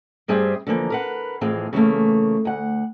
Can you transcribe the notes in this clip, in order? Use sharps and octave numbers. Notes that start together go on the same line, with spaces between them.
G2 G3 C4 G#4 C5 E5
D3 E3 F3 A#3
A#4 B4 F#5
F2 A2 E3 C4 G#4 F5
C#3 E3 F#3 A3 A#3
D2 F#5